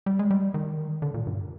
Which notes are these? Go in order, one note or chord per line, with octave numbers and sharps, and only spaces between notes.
G3
G#3
G3
D#3
D3
A#2
G2